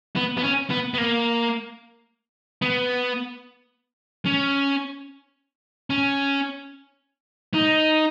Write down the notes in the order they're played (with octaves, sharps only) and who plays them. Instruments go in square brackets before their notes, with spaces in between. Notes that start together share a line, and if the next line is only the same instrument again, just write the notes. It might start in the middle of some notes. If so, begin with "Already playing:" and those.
[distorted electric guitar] B3
B3
C#4
B3
B3
A#3
B3
C#4
C#4
D#4